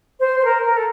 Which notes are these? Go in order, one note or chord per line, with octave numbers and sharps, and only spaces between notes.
C5
C5
A#4
A#4
A4